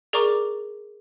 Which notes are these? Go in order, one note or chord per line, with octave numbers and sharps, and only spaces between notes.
G#4 A#4 D5 A#5 C#6 D6